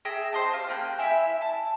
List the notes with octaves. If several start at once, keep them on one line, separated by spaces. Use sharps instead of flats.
G#4 E5 G5 A#5
C5 D#5 A5
F4 G4
A#3 G5 A#5 F#6
E4 E5 G#5
A5